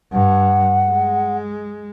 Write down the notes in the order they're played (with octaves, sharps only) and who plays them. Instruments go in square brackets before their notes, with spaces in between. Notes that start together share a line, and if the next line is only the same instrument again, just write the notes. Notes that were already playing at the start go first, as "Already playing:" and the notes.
[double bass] G2 [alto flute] F#5
[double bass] G#3